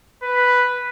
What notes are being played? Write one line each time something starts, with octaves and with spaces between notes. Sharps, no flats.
B4